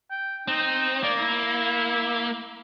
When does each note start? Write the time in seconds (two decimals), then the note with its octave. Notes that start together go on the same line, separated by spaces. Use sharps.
0.11 G5
0.48 C4 D#4
1.03 A#3 D5
1.18 E4